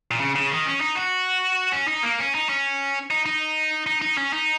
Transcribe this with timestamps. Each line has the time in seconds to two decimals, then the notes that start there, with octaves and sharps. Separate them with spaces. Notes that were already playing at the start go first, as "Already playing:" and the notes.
0.11 A#2
0.20 C#3
0.36 C#3
0.51 D#3
0.67 C#4
0.81 D#4
0.96 F#4
1.73 C#4
1.88 D#4
2.03 A#3
2.19 C#4
2.35 D#4
2.49 C#4
3.10 D#4
3.26 D#4
3.86 D#4
4.02 D#4
4.18 C#4
4.33 D#4